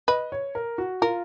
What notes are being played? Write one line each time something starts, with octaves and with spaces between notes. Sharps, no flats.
B4 D#5
C#5
A#4
F#4
F4 A#4